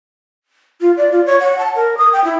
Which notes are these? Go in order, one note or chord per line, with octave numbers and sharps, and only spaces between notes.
F4
D5
F4
C#5
F#5
A5
A#4
D#6
G5
E4